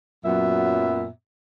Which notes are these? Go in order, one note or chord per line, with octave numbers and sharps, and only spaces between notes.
F#2 A#2 F#3 B3 E5